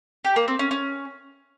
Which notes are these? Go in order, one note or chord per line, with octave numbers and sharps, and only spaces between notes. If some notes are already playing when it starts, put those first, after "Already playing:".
G4
A#3
C4
C#4
C#4